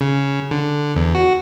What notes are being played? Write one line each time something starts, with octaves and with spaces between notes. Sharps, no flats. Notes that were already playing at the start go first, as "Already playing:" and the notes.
C#3
D3
E2
F#4